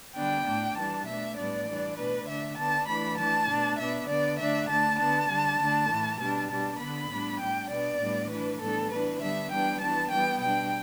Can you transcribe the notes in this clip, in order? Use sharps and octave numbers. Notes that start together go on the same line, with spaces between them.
D3 G3 B3 D4 G5
A2 A3 D4
E3 G3 D4 A5
B2 A3 D4 E5
A2 G3 B3 D4 D5
E3 G3 D4
B2 A3 D4 B4
D3 A3 D4 E5
D3 B3 D4 A5
E3 A3 D4 B5
E3 A3 D4 A5
B2 A3 D4
B2 B3 D4 E5
D3 B3 D4 D5
D3 A3 D4 E5
D3 A3 D4 A5
D3 B3 D4 A5
D3 G3 D4
D3 A3 D4
A2 E3 A3
B2 G3 D4 A5
B2 G3 D4 A5
D3 B3 D4 B5
A2 G3 B3 D4
A2 G3 D4 G5
B2 B3 D4 D5
A2 G3 B3 D4
E3 A3 D4 B4
A2 E3 G3 B3 D4 A4
E3 B3 D4 B4
D3 G3 B3 D4 E5
E3 G3 B3 D4 G5
E3 B3 D4 A5
E3 G3 B3 G5
B2 G3 D4 G5